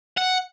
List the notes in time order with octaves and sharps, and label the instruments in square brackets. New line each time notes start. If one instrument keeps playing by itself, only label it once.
[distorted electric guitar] F#5